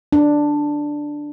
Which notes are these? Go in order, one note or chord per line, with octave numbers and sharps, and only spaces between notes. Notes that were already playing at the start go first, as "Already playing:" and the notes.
D4